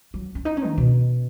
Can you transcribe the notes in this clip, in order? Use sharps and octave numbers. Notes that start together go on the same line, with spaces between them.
F#3
C#4
D#4
C#4
D#3
B2